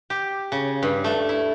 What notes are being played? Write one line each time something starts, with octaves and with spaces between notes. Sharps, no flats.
G4
C#3
G2
A3
E4